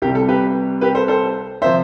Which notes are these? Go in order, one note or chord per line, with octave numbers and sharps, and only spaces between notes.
C2 C3 G3 G4
A4
G4 B4
G4 B4
A4 C5
A4 C5
C3 F3 C5 E5